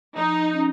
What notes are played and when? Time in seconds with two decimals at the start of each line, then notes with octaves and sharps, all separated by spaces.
0.16 F3 D#4
0.54 C#4